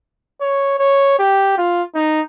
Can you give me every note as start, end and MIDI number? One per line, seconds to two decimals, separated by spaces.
0.41 0.78 73
0.79 1.17 73
1.19 1.56 67
1.58 1.83 65
1.95 2.21 63